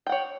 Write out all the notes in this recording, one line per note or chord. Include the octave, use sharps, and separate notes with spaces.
C#5 F#5 G5